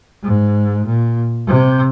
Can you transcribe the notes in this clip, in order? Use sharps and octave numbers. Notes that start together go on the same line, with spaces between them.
G#2
A#2
C3